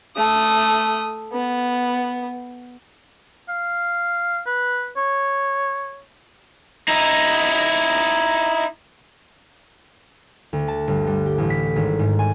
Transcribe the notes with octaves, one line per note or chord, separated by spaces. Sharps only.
A3 D#6
B3
F5
B4
C#5
D#4 E4
D2
A5
G1
G3
G4
A1
B6
G#1
G#2
G#5